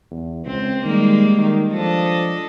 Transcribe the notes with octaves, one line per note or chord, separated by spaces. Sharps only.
E2
C#2 C4
D#3 G3 G#3 A#3
D#3
F3 D4 A4 D#5